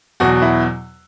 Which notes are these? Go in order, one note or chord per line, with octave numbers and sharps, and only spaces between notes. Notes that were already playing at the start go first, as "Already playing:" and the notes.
E2 B2 F#3 F#4
E4